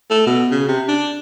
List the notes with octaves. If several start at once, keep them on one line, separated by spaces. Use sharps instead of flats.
A3
B2
C#3
C3
D4